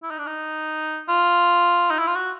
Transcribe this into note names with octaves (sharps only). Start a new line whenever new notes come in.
E4
D#4
D4
D#4
F4
D#4
E4
F4
F#4